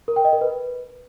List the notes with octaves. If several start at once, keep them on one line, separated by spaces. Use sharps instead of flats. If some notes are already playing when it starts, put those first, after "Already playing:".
A#4
G5
D#5
A#4
B4